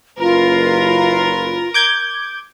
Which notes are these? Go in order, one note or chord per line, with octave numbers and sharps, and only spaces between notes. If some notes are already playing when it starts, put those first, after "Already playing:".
F#1 F4 A#4 B4
D6 G6 G#6